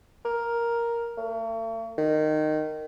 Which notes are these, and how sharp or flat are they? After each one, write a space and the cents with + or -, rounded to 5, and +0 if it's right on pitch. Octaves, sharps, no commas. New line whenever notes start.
A#4 +5
A3 +45
D#3 -15